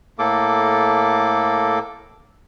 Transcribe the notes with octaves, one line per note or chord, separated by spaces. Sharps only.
A2 A#3 A4 D6